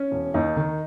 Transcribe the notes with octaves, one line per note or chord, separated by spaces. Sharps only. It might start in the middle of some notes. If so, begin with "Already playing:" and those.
Already playing: C#4
E1
D#2 D#4
D#3